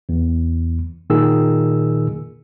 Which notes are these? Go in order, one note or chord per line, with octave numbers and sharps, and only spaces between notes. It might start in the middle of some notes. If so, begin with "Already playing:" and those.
E2
A#2 D#3 G#4 E6